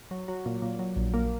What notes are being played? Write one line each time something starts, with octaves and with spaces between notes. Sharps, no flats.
F#3
F#3
A#2
A#2
F#3
A#1
A#3